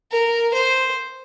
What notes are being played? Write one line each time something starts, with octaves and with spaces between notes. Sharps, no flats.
A#4
C5